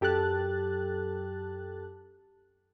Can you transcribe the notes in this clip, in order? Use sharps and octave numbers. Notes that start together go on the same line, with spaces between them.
F#2 G4 A4 A5 F#6 A6